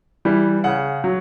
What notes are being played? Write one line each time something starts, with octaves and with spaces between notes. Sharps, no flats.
E3 G3
C#3 F#5
F#3